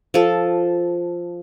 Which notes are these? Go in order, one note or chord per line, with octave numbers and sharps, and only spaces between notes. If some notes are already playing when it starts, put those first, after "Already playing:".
F3 A4